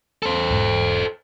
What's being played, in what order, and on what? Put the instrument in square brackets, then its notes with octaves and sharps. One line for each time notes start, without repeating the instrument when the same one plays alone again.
[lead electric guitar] A4 C5
[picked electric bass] E1 G#2